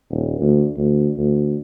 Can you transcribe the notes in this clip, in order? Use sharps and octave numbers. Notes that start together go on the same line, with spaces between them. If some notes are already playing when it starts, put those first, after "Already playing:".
D#1
D2
D2
D2